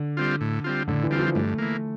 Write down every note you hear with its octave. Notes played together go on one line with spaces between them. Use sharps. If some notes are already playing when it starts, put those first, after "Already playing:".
Already playing: D3
G3 C4 F4
A2
G3 C4 F4
A2 D3
E3
G3 C4 F4
F3
G2 A3
E3 A#3